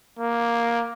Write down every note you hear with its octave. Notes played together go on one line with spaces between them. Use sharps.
A#3